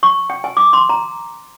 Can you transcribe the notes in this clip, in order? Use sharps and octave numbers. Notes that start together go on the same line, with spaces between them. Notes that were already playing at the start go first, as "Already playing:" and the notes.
C#6
G5
G#5
D6
C6
A#5